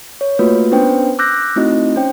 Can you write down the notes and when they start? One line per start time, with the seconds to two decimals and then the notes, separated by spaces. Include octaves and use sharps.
0.21 C#5
0.39 A3 A#3 F4 F#4 B4
0.72 B3 C#4 D4 B4 C5 G5
1.19 D6 E6 F#6 G6 A#6
1.56 A3 C4 D#4 E4 F#4 D#5
1.96 C#4 C5 G5